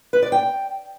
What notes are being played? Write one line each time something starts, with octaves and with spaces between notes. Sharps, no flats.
B4
D5
G5